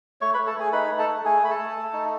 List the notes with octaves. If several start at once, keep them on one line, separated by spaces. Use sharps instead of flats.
A3 C#5 C#6
B4 B5
A3
A4 A5
A3 G#4 G#5
D#4 B4 B5
A3
A4 A5
A3
A3 G#4 G#5
A3 B5
A4 A5
A3
A3
D#4